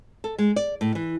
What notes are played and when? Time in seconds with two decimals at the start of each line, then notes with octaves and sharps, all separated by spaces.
0.24 A4
0.38 G#3
0.56 D5
0.81 A2
0.95 E3